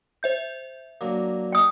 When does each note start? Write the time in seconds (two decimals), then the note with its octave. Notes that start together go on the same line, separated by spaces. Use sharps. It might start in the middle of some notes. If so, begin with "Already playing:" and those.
0.23 C5 E5 G6
1.01 F#3 A#3 D4
1.52 G5 D#6